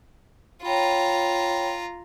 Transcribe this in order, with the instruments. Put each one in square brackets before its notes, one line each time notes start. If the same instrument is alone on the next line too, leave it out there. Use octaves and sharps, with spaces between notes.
[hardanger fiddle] F4 A#5 [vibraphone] C#5 G5 B5